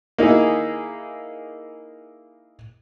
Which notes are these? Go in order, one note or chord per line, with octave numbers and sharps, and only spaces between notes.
A#3 D#4 E4 G#4